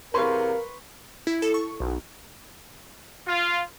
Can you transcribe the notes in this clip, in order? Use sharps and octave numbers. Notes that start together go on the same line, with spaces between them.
E2 C3 A#4 B4 F5 C6 C#6
E4
A4
C#6
B1
F4